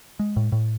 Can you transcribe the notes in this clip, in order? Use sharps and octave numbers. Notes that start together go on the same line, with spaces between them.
G#3
A2
A2